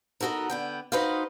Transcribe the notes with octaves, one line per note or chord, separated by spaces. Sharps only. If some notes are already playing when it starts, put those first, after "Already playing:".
B3 D#4 F#4 A4 A#4
D3 B3 G5
D#4 F#4 B4 C5 D#5 F5